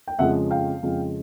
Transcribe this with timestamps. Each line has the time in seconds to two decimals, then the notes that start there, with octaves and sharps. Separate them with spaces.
0.08 G5
0.19 F2 C#3 F3 G#3 E5 F#5
0.51 F5 G5
0.83 F2 C#3 F3 G#3